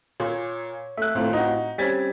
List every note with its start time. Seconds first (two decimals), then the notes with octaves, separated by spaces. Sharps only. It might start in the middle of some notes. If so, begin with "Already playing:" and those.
0.20 A#2 C#5
0.97 A3 E5 F#6
1.15 G#1 A2 A3 C4 F4
1.33 D#4 F#4
1.78 G3 C4 C#4 G#6 A6 B6